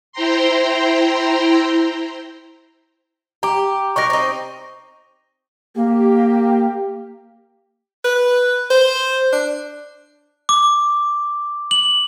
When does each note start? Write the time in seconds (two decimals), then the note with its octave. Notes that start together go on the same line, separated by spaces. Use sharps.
0.12 E4 C5 G5 A#5 C6
3.43 G4 A#5 D6
3.96 F#3 D#4 A#4 C#6 A#6
4.10 C4 D#4
5.76 A#3 G4
8.05 B4
8.70 C5
9.33 D4
10.49 D6
11.71 F#7